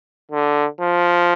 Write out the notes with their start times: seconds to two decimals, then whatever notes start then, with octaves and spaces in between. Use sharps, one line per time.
0.32 D3
0.81 F3